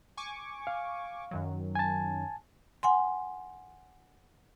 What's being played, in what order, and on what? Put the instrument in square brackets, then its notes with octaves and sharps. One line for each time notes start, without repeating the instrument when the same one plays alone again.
[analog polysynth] G#5 C#6 D6
[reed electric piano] F5
[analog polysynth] F#2 D#3 F#3
[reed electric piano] G#5 A5
[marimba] F#5 G#5 C6